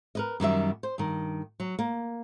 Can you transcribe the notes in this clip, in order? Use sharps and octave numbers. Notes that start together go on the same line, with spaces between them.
A#4 B4 D#5
F#2 D#3 G3 E5
C5
G2 D#3
F#3
A#3